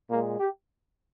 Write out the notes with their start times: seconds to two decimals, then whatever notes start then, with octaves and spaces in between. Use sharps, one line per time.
0.10 A#2 G#3 A#3
0.39 G4